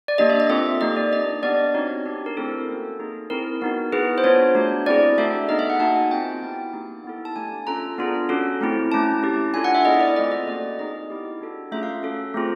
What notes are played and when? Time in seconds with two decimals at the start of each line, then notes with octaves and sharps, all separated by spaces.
0.08 D5
0.18 A#3 D4 G4 D#5
0.30 E5
0.40 D#5
0.50 C4 F4 A4 E5
0.81 A#3 D#4 G4 D#5
0.96 D5
1.12 D4 G4 D#5
1.43 B3 D4 G4 D5
1.74 C4 D#4 F#4 C#5
2.05 D4 G4
2.26 A#4
2.37 A3 C4 E4 G#4 A4
2.68 A#3 C#4 F#4 A4
2.99 A#3 D#4 G#4
3.30 C4 E4 G#4 A#4
3.62 B3 D#4 F#4
3.93 B3 E4 G#4 B4
4.18 C5
4.24 B3 D4 F4 C#5
4.55 A3 D4 F#4
4.86 C4 E4 G#4 D5
5.18 A3 D4 F#4 A4 E5
5.49 B3 D#4 G#4 D#5
5.59 E5
5.70 F#5
5.80 A#3 D#4 F#4 A5
5.96 G#5
6.11 C4 F4 G#4 G5
6.42 B3 E4 G4
6.73 A#3 D#4 G4
7.04 B3 E4 A4
7.25 A5
7.36 A3 D4 G4 G#5
7.67 C#4 F4 A4 A#5
7.98 B3 D4 F4 G#4
8.29 C#4 F#4 A4
8.61 A3 C4 E4
8.92 A3 C#4 E4 A5
9.23 C#4 E4 G4
9.54 D4 F4 A4 G#5
9.64 F#5
9.75 E5
9.85 B3 E4 G#4 D#5
10.01 D5
10.16 A3 C4 F4 A4 D#5
10.32 D#5
10.48 A#3 C#4 F#4 D5
10.79 C4 D#4 G#4 D#5
11.10 B3 E4 G4
11.41 D4 F#4 A4
11.72 A3 C#4 F4 G#4 E5
11.83 F5
12.03 C#4 F#4 A4
12.34 A3 C4 F4 G#4